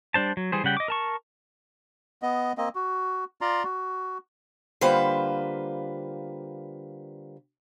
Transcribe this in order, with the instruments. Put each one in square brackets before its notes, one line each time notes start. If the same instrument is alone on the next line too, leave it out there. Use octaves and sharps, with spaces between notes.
[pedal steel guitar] G3 D4 C5 A5
F#3
E3 G3 G#4 C5
C#3 G3 F#5 G5
D#5 D6
A#4 A5 C#6
[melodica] B3 D#5
A#3 C4 D#5
F#4
F4 D5 A#5 C6
F#4
[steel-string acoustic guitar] D3 G3 A#3 F4 B4 C5